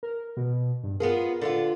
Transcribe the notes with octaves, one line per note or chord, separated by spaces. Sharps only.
A#4
B2
G2
B3 F4 G#4 A#4
D3 B3 F4